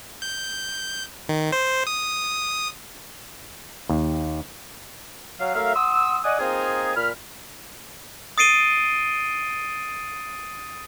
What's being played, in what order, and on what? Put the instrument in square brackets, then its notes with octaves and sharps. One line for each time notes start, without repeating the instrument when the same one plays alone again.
[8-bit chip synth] G6
D#3
C5
D#6
[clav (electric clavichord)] D#2
[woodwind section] F#3 F5
F#3 A3 A#4 E5 F5
F#5 C6 D#6 E6
D5 D#5 F#5 G#5 D#6
A#3 C4 D#4 F4 G#4
A#2 B5 F6
[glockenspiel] D#6 A6 C7 D7 D#7 G7